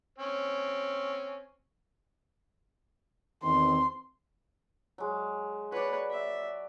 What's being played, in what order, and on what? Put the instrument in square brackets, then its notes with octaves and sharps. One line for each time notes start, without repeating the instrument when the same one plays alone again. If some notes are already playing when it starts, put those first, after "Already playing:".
[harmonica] C4 C#4
[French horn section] E2 D#3 C4 [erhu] C6
[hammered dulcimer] F#3 G#3
[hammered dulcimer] F#4 D5 [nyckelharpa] B4 C#5
[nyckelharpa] E5